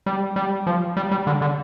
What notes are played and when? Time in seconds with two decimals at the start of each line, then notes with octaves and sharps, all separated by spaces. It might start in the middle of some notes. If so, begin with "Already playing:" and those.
0.06 G3
0.36 G3
0.67 F3
0.97 G3
1.11 G3
1.27 D3
1.41 D3